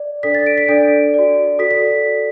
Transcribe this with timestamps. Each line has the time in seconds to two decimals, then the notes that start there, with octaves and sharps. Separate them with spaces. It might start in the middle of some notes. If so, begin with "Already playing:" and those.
Already playing: D5
0.23 D4 A4 D5 B6
0.34 A6
0.46 D7
0.58 B6
0.68 D4 A4 D5 D7
1.14 F#4 D5
1.59 F#4 A4 D5 B6
1.71 B6